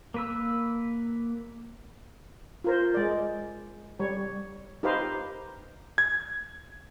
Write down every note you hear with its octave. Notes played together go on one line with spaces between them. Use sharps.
A#3 B4 E6
F4 A#4 C5
G#3 D5
G3 C#5
D#4 G4 B4 C5 F5
G#6